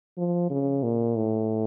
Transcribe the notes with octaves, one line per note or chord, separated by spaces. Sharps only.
F3
C#3
A#2
A2